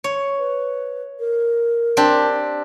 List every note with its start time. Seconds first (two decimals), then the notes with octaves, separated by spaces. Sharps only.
0.04 C#5
0.39 B4
1.20 A#4
1.97 C4 D4 G4